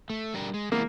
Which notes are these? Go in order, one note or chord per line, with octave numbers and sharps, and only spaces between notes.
A3
G3 D4 A#4
G#3
E3 G#3 A#3 B3